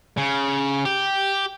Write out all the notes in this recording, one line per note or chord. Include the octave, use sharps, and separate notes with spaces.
C#3
G4